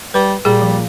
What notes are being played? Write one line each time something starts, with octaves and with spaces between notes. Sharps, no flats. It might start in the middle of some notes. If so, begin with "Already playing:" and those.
G3 B4
A#2 G3 G#4
F3